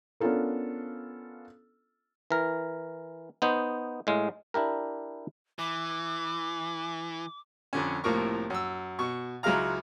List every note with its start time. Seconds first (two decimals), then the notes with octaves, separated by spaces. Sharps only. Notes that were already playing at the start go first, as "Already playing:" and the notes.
0.20 B3 C#4 D4 F4 A4 A#4
2.31 E3 A#4
3.42 B3 D#4 C5
4.07 A2 G#3 F5
4.54 D4 E4 G4 A#4
5.59 E3 D6
7.73 F2 D3 C#4
8.04 C2 A2 F3 A#3 A#4 C#6
8.50 F#2 E6
8.99 B2 C#6
9.43 C#2 F#3 G#3 E4 F5 A#5